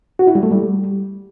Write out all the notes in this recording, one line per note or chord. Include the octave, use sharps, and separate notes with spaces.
F#4
E4
G3
A3
G3